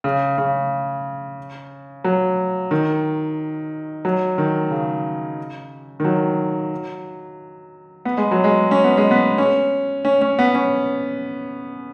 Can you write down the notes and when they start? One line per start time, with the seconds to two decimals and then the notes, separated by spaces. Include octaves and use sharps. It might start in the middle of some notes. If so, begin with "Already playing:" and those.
0.04 C#3
0.38 C#3
2.04 F#3
2.71 D#3
4.05 F#3
4.38 D#3
4.71 C#3
6.00 D#3
6.04 F#3
8.05 B3
8.17 G#3
8.31 F#3
8.44 G#3
8.71 C#4
8.84 B3
8.97 G#3
9.11 B3
9.38 C#4
10.05 C#4
10.21 C#4
10.39 B3
10.55 C#4